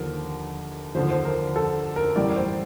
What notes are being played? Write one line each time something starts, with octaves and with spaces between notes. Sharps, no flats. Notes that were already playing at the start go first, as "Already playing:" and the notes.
Already playing: D#2 D3 F3 A#4
D#2 D3 F3 C5
C5
A#4
A4
A#4
A1 A2 G3 D5
C5